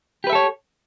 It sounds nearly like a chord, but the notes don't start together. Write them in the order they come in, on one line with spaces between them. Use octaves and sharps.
G4 B4 E5 A4 C#5